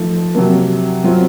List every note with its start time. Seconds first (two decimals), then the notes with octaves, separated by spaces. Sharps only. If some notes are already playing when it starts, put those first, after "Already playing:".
Already playing: F3 A3 D#4
0.35 C3 F#3 A#3
1.04 F#3 C4 F4